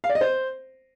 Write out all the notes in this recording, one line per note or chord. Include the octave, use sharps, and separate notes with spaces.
F5
D5
D#5
C5